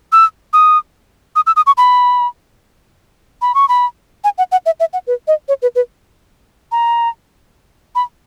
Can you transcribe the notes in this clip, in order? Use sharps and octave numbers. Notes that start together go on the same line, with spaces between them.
E6
D#6
D#6
E6
D#6
C#6
B5
B5
C#6
B5
G#5
F#5
F#5
E5
E5
F#5
B4
D#5
C#5
B4
B4
A#5
B5